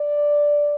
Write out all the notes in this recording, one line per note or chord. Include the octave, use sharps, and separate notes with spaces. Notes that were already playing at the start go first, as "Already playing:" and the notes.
Already playing: D5